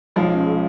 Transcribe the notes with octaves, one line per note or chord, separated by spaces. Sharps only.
B1 F3 G#3
C#4
G#3